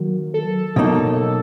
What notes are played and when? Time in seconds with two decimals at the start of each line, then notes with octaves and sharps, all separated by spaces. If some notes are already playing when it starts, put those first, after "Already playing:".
Already playing: D#3 F#3 A#3
0.34 A4
0.76 B2 F#3 A#3 D#4